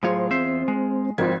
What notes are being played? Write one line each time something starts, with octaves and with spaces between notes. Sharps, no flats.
A2 F#3 F4 G#4 C5 C#5
E2 C4 C5 E5
G#3
G#1 F3 G3 C4 F4 G#6